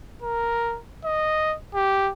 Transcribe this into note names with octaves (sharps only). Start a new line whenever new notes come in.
A#4
D#5
G4